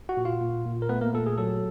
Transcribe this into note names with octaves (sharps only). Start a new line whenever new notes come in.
F#4 F#5
A#2
F4 F5
A#2
A#2
A#4
A3 B3 B4
A#3 A#4
A#2 A4
G#4
F#3 A4